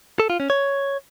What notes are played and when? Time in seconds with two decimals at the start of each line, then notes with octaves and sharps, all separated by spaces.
0.20 A4
0.30 F4
0.40 C#4
0.50 C#5